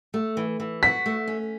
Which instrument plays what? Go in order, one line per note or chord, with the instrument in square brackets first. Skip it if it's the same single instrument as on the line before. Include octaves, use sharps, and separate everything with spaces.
[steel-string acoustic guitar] A3
E3
E3
[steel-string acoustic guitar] F#4 [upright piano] B6
[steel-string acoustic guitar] A3
C#4